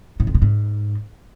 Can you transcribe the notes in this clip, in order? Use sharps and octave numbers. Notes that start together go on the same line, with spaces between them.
A2
F2
A#2
G#2